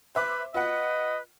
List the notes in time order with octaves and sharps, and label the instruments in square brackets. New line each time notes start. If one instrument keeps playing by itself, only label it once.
[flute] B4 [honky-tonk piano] C5 E5 D6
[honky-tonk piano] F4 F#5 [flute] B4 [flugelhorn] D#5